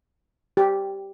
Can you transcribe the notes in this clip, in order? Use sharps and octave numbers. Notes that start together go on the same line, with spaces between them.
G4